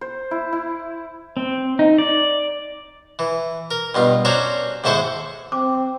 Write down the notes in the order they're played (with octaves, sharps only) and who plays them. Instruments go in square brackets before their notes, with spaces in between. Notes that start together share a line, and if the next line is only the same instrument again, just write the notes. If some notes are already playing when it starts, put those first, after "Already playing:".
[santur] C5
E4
E4
[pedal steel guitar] C4
D#4
D5
[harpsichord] E3
A#4
G2 B2 F4
C#4 D4 F#4 C5 C#5 A#5
D#2 G#2 E4 A4 C5 C#6
[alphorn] C4 [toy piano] D6